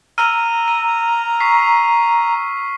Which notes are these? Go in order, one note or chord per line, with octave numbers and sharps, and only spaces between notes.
A#5 E6 F6 D#7
D#7
C#6 B6 C7